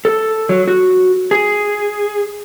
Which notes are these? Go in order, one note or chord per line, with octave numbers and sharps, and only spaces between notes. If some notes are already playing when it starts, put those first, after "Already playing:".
A4
F#3
F#4
G#4